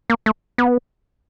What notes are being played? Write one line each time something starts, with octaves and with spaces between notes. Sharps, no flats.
A#3
A3
B3